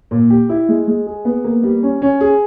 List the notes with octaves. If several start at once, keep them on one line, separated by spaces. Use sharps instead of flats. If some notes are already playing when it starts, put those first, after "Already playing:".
A#2
G4
E4
G#3
G#3
G#4
B3
A#3
G3
C#4
C#4
G#4